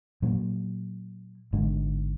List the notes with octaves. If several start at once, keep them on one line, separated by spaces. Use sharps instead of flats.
A#2 F#3
G#1 G#2 D3